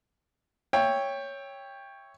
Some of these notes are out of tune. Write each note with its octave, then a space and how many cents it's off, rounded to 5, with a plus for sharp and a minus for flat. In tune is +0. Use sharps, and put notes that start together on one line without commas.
C#5 +0 E5 +0 G5 +15